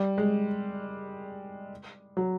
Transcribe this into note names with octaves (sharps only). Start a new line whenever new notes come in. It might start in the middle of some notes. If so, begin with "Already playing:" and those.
Already playing: G3
G#3
F#3